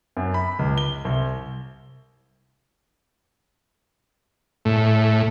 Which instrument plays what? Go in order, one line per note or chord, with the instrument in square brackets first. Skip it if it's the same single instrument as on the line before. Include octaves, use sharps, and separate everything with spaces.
[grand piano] F#2
B5
C#2
G7
C2
[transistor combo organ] A2